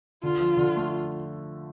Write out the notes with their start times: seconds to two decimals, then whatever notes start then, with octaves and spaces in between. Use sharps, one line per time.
0.23 D3 F4
0.40 F3
0.57 D3
0.76 A3